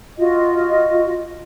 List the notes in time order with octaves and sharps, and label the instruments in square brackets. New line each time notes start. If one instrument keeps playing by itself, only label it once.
[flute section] F4 F#4 D#5